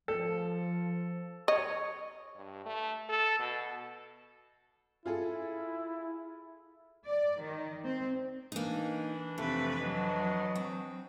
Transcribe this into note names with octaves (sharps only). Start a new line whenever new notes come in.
F3 A4
C#5 D#5
G2
A3
A4
B2
E4 F4 G#4 A4
D5
D#3
C4
E3 A#3 D4 D#4
F2 C3 A3 B4
F#3 D#5
C4